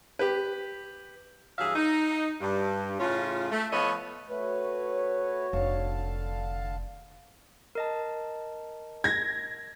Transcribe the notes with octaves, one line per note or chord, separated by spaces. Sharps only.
G4 B4
G2 E3 F#3 G#4 E5 F5
D#4
G2
A2 C#3 C#4 F4
A3
F3 B3 A4 B4 C#5 D#5
A3 F#4 B4 C#5
F1 D3 F5 A5
A#4 D#5 A5
G#6 A#6